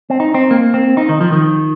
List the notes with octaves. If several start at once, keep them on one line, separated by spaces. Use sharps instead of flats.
C4
D#4
C4
A#3
C4
D#4
D#3
F3
D#3